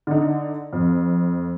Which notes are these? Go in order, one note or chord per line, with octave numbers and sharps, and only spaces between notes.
D3 D#4
F2